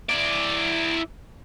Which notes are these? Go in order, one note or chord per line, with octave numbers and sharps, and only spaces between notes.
E4 D5